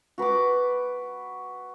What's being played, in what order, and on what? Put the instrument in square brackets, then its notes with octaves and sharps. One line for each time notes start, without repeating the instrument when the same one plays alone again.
[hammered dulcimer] F#4 B4 B5 D6